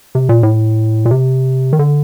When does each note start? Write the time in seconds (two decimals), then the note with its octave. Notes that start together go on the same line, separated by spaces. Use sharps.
0.15 C3
0.29 A#2
0.43 A2
1.06 A#2
1.11 C3
1.73 D#3
1.79 D3